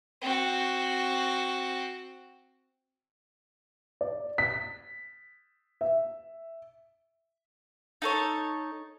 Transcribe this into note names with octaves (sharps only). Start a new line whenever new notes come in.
C4 F#4
D5
B6
E5
D#4 A4 C#5